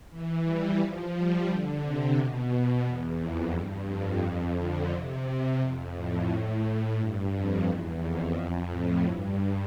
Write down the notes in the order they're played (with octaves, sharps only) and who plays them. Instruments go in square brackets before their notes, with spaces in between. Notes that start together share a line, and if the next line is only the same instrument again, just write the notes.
[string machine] E3
G3
F3
G3
D3
C3
B2
E2
F2
G2
F2
D3
C3
F2
A2
A2
G2
F2
E2
F2
F2
A2
G2